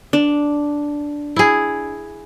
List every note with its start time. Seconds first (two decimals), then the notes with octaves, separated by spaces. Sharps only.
0.13 D4
1.36 E4 G#4